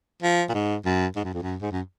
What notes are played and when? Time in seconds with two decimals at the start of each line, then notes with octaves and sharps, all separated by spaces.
0.22 F3
0.49 A#2
0.54 G#2
0.85 F#2
1.16 G#2
1.24 F#2
1.34 F2
1.42 F#2
1.61 G#2
1.71 F#2